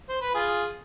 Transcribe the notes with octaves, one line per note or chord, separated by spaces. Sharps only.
C5
B4
F4 G#4